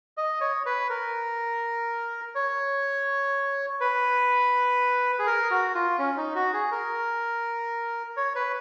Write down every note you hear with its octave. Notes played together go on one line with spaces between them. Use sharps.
D#5
C#5
B4
A#4
C#5
B4
G#4
A#4
F#4
F4
C#4
D#4
F#4
G#4
A#4
C#5
B4